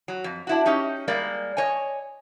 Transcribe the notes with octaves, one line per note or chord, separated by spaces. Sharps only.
F#3
F2
D4 E4 F#4
C#4 D#4 G4
G3 G#3 A#3 D5
C#5 D#5 G#5